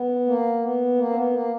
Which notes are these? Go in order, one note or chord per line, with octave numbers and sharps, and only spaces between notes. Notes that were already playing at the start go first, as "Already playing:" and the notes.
Already playing: B3
A#3
B3
A#3
C4
B3
A#3